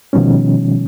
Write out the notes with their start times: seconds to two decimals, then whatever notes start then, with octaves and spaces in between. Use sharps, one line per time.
0.13 B2 D#3 F3 G3 C#4